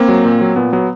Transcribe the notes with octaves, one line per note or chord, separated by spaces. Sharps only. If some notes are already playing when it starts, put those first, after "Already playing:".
Already playing: A#3 C4
F#3
A#2
F#3
A#2 B3
F#3 B3